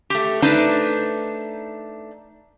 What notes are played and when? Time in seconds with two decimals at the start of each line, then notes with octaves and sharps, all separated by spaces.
0.10 A3 G4
0.42 A3 D4 D#4 B4 C5